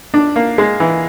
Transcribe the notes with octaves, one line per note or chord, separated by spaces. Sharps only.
D4
A#3
G#3
E3